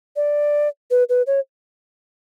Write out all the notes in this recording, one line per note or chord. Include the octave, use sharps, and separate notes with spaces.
D5
B4
B4
C#5